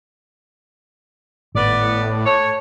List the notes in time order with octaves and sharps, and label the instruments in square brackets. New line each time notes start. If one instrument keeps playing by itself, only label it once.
[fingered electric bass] G#1 [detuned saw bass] A2 [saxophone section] B3 D5
[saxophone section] A3 A4 C#5